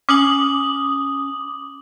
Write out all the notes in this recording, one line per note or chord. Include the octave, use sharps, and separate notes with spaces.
C#4 D6 D#6 F#7